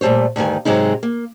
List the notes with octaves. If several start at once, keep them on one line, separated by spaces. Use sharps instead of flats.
A#2 G3 A3 C5 C#5
D2 G2 D#3 G#5
G#2 C3 F#3 G#3 D#4
A#3